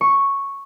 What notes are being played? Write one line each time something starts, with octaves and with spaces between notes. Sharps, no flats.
C#6